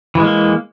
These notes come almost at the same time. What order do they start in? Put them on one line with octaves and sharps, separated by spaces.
E3 G#3 A#3